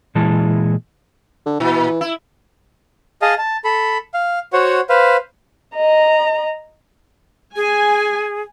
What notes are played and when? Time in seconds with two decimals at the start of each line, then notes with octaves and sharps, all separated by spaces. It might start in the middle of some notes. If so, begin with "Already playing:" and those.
0.15 A#2 E3 G#3 E4 A5
1.46 D3
1.60 A#2 E3
2.01 E4
3.22 G#4 D#5 F5 A5
3.38 A5
3.65 A4 B5
4.14 F5
4.53 F#4 C5 C#5 F#5
4.90 B4 C5 F5
5.76 D#5 A#5
7.56 G#4 G#5